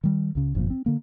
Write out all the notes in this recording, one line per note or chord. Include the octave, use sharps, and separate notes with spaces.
D#3 G3
C#2 C#3
G1 F2 A#2
C4
D3 A#3